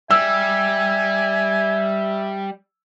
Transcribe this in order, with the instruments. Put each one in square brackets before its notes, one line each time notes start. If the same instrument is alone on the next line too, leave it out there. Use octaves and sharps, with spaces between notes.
[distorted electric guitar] G3 [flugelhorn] E5 [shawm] G#5 [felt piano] E6